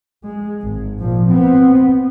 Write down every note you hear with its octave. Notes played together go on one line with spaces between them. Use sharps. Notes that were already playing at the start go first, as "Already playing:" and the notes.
G#3
G#1
A#2 F3
B3 C4